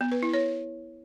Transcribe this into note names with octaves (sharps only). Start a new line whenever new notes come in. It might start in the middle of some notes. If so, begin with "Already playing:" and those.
B3
B4
E4
C#5